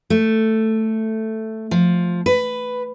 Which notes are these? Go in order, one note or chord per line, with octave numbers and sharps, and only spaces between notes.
A3
F3
B4